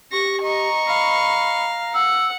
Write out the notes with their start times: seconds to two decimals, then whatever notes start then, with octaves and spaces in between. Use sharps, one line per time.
0.12 G4 C#6 A#6
0.42 D#5 A#5 C#6
0.87 F5 B5
1.94 F#5 E6